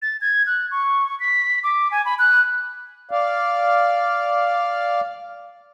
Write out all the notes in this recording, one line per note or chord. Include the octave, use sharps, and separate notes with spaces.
A6
G#6
F#6
C#6
B6
D6
G#5
B5
F#6
D5 F5